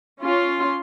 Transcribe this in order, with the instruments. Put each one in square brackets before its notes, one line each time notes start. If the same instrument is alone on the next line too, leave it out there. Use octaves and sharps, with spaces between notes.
[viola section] C#4 F4 C6